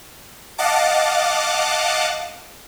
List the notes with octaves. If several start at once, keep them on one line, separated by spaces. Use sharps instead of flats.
D#5 F5 F#5 A5 D6